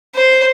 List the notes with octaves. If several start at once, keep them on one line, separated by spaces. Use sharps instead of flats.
C5